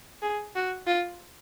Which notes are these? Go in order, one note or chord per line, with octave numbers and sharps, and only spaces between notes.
G#4
F#4
F4